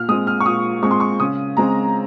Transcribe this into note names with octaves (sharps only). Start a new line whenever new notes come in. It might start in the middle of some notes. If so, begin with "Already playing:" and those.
Already playing: A#2 F6
G#3 C4 D#6
F6
C#6
A#2 D#6
G#3 C4 C#6
C6
C#6
C#3 D#6
G#3 C4 A#5